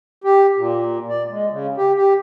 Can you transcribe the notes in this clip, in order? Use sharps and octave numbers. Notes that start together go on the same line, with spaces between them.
G4
A#2
D5
G#3
C#3
G4
G4